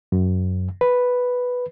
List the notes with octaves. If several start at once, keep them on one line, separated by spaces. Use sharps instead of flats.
F#2
B4